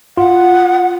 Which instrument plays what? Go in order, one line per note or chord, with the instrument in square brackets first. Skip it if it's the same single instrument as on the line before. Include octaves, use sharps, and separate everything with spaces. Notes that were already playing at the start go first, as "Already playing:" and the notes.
[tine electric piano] F4 [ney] F#5